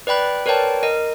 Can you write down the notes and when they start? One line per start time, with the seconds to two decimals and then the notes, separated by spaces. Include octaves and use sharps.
0.07 B4 D5 G5 B5 F#6
0.46 A#4 B4 C#5 D5 G5 A5
0.83 A#4 D#5